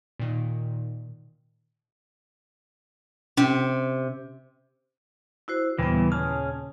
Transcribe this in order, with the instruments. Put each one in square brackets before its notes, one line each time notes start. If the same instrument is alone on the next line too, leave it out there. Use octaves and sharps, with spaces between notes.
[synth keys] A#2 D#3
[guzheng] C3 [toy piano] C#4
[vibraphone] E4 F#4 C5
[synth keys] D#2 A#2 C#3 [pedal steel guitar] E3 [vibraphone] G3 B3
[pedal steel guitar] C#4 G#4 F6 [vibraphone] A5